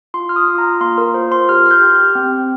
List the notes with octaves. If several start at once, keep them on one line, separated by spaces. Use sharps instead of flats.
F4 C6
F6
D#6
F4
A#5
A#3 C6
A#4
F4 C5
C6
G4 F6
F6
G6
G4
C4